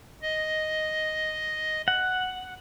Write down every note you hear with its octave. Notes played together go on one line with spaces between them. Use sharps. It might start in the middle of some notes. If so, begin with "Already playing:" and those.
D#5
F#5